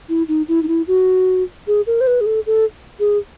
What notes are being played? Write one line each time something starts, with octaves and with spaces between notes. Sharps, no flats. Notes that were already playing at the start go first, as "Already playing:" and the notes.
E4
D#4
E4
D#4
E4
F#4
G#4
A#4
C5
B4
G#4
A4
A4
G#4